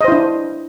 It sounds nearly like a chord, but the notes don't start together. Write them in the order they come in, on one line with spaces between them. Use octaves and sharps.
D#5 C5 E4 D4